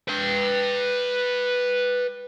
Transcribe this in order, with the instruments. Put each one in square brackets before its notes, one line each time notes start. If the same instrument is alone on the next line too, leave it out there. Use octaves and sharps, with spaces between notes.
[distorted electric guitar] B4 G5